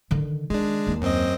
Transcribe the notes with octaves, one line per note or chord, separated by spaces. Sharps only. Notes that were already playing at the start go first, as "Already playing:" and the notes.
D3 D#3
D#3 G#3 D4
D#2
F#2 C4 D#5